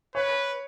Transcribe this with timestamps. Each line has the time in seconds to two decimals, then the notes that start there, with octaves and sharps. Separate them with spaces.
0.15 B4 C#5